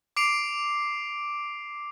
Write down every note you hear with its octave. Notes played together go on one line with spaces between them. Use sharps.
D6 C7 D7 F7